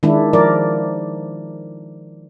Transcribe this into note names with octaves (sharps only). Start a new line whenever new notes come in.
D#3 G#3 D4 E4
F3 A#4 D5